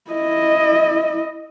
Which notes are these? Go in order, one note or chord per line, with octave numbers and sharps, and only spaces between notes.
E4 D#5